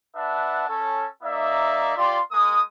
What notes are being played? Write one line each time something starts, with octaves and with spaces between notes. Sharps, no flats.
D4 B4 E5 F#5 A5
C#4 A4
A#3 D#4 D5 E5
F4 G4 D5 C6
G#3 A#3 D#6